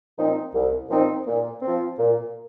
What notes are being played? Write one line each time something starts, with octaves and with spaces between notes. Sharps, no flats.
A#2 F3 C4 D#4
C2
A#2 F3 C4 D#4
A#2
F3 C4
A#2